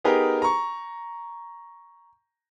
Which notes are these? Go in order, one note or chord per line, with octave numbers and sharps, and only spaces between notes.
B3 D#4 G4 G#4 A#4 B4
A#5 C#6